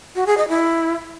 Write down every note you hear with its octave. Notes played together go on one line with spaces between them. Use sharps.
F#4
G#4
D#5
E4